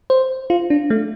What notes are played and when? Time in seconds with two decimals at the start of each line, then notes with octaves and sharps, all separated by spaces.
0.10 C5
0.50 F4
0.70 D4
0.90 A3